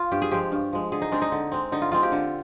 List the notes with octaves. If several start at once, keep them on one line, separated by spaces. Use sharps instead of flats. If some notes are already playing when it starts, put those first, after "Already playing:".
Already playing: F4
G2 G4
G#4
F3 G#3 G4
G2
F3 G#3
D3 G#4
D#4
G#3 C4 D4
D#4
D3
G#3 C4
D3 D#4
F4
G#3 C4 F4
G4
D3